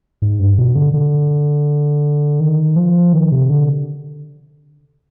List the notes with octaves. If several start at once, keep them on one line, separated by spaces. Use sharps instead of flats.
G#2
G2
B2
D3
D3
D#3
F3
D#3
C3
D3